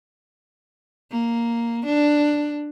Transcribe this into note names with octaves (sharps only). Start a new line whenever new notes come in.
A#3
D4